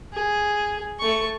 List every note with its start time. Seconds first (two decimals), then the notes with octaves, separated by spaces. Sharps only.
0.13 G#4
0.99 A3 C#6